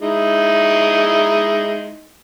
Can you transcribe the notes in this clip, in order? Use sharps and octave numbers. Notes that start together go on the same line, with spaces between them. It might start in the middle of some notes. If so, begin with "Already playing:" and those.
G#3 D#4 E4